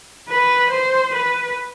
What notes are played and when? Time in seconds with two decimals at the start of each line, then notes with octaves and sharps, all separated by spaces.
0.29 B4
0.70 C5
1.14 B4